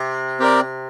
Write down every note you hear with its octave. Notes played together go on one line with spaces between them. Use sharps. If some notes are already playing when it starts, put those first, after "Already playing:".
Already playing: C3
C4 G4 A#4 D5